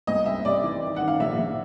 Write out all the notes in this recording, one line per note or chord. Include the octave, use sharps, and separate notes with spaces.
C2 D#5
C2 E5
C3 D5
E3
D#3
D#3 F#5
F5
A#1 E5
A#1